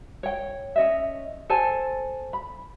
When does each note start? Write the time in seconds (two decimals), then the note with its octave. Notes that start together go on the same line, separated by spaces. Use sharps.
0.23 C#5 G5
0.76 C#4 D#5 E5
1.50 A4 C5 G#5 A5
2.33 B5